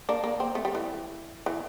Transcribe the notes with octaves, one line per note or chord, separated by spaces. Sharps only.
A#3 D4
A#3
C4
A3
G3
E3
E3